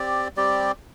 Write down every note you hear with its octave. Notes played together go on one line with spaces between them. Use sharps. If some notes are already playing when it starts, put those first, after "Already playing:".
Already playing: C4 G4 D5
G3 C4 G4 D5